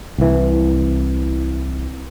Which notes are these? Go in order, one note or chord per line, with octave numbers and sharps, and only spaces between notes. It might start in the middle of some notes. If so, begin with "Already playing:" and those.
C2 E3